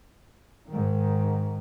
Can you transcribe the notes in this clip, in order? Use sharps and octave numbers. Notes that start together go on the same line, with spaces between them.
G#2 D#3